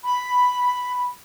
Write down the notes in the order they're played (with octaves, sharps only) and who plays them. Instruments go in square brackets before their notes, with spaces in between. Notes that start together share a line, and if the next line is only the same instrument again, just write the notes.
[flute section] B5